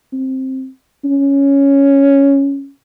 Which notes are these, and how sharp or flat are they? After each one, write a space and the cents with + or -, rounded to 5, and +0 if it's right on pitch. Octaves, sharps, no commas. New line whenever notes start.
C4 +10
C#4 +0